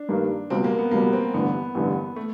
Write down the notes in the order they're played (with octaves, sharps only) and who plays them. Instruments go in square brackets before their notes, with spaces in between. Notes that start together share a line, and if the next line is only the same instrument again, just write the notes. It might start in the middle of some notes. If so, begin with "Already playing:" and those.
Already playing: [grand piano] D4
[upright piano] G2 D#3 G3 A#3
[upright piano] C#2 B2 G3 B3 [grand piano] C4
[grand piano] A#3
B3
[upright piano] C#2 B2 G3 B3 [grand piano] A#3
[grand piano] C4
[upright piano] A1 G2 D3 [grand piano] B3
[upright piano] A1 G2 D3
[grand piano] A3